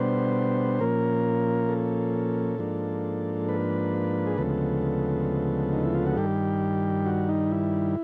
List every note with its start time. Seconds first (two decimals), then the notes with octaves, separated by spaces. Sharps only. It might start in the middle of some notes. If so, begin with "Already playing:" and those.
Already playing: B2 G3 B3 D4 C5
0.79 A#2 F3 A#3 C#4 A#4
1.69 A4
2.58 G#2 F3 A#3 D4
3.49 B4
4.27 G#4
4.38 D2 C#3 F3 G#3 B3 A4
5.73 D#4
5.84 E4
5.94 F4
6.07 F#4
6.16 G2 D#3 G3 G4
7.06 F#4
7.29 D#4
7.51 E4